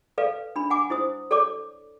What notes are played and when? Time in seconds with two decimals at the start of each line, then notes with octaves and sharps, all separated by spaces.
0.18 A4 B4 D5 F5
0.56 D4 B5
0.70 F#5 G#5 D6
0.90 E4 C5 D#6
1.31 A4 C#5 D5 D6